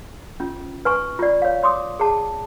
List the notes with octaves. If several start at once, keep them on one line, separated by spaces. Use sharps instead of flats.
C#4 F4
B4 G#5 C#6
F4 D5
C#5 F5
C#5 C6 D6 D#6
G#4 A5